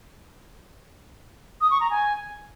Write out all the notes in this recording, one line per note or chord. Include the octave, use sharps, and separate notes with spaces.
D#6
C#6
A#5
G#5